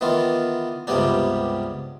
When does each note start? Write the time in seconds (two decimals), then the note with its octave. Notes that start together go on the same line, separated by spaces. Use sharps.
0.01 D#3 E3 B3 F4
0.87 C#2 G2 C3 G3 B3 D4